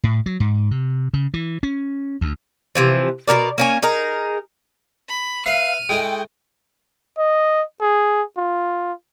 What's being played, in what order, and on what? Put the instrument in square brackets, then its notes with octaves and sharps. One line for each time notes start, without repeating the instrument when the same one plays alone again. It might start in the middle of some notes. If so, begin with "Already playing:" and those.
[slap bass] A2
F#3
G#2
C3
C#3
E3
C#4
D2
[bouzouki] C3 E3 F3
B2 E3 A#4 D5
A#3 C#4 G#5
D#4 G#4 A#4
[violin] B5
[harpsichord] B4 E5 [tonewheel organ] F5 [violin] F6 D#7
[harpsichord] G#3 A3 E4 [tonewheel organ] G5
[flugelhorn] D#5
G#4
F4